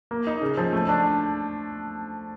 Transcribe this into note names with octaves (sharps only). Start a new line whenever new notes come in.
A#3
D#4
C#3
F3
A3
D4